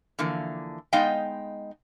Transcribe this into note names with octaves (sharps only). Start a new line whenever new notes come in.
D3 E3 F3 A#3
G#3 B3 D#4 D#5 F5 G5